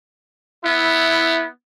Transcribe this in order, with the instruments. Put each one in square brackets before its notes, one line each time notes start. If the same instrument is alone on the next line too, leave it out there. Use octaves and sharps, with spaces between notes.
[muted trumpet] B3 [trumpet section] E4